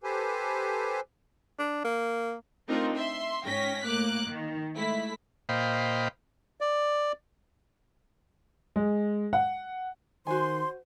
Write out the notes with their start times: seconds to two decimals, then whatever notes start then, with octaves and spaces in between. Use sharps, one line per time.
0.03 G4 A4 B4 C5 G#5
1.58 D4
1.84 A#3
2.68 A3 C4 D4 D#4 F4 A#4
2.97 E5 C6
3.43 G#2 C#4 G5 A#6 B6
3.85 A2 A#3 D6 F#6
4.28 D#3
4.75 G#3 A3 E4 B6
5.49 A#2 C5 D#5 F5 G5 B5
6.61 D5
8.76 G#3
9.33 F#5
10.27 D#3 F#4 C5 G#5 C6